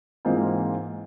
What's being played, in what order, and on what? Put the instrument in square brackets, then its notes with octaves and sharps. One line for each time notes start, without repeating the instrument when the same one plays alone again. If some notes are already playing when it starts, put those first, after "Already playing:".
[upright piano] G#2 E3 G#3 A#3 C4 F4